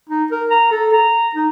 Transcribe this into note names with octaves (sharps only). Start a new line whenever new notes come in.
D#4
A#4
A#5
A4
A#5
D#4